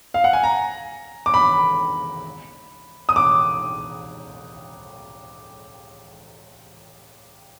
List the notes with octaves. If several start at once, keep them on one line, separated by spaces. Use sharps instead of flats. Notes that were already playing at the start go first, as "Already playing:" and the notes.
F5
F#5
G#5
A#5
D6
B5
D#6
D6